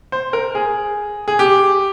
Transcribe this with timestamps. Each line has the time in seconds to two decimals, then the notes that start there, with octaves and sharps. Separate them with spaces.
0.12 C5
0.33 A#4
0.55 G#4
1.28 G#4
1.39 G4